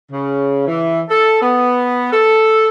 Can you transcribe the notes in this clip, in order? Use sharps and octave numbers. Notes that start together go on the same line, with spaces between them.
C#3
E3
A4
B3
A4